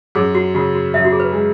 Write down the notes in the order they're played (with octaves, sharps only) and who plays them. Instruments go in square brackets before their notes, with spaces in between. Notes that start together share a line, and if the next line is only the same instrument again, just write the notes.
[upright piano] F#2 [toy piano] G#4
[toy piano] F#4
[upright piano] C#3 [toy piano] F#4
[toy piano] F#4
[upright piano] F#2 [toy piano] E5
[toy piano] F#4
G#4
B4
[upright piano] G#3